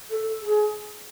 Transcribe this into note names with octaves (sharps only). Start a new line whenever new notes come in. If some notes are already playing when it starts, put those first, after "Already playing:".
A4
G#4